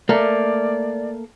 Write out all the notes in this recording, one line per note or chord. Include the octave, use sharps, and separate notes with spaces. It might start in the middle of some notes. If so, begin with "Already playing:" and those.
A3 A#3 D5